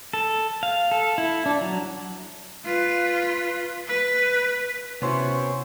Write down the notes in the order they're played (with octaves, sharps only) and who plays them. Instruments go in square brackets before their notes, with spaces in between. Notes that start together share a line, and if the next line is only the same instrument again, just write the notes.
[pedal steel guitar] A4
F5
A4
E4
D4
F#3
[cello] F4 B4
B4
[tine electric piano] C3 C6 [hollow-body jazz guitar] B3 F#4 [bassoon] C#4 [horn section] E4 C5 C#5